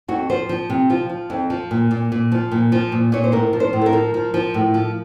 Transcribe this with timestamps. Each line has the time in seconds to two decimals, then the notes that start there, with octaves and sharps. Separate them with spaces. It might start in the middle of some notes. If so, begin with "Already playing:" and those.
0.08 F2 F#4
0.30 F3 C5
0.49 F3
0.70 C3
0.90 F3 F4
1.10 F3
1.30 F2
1.50 F3
1.71 A#2
1.91 A#2
2.12 A#2
2.32 F3
2.51 A#2
2.72 F3
2.92 A#2
3.12 A#2 C#5
3.24 C5
3.32 A2 A#4
3.53 F3
3.60 C5
3.73 A2
3.81 A4
3.86 A#4
3.93 F3
4.14 F3
4.34 F3
4.54 A2
4.74 F3